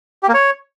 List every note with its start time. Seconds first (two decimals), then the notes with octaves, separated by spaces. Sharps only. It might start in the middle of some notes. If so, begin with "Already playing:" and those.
0.23 G4
0.28 A#3
0.34 C#5